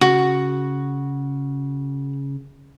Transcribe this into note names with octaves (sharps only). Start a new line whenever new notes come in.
C#3 F#4